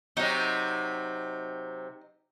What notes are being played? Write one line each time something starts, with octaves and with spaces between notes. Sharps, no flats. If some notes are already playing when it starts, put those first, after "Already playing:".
C3 F#3 D#4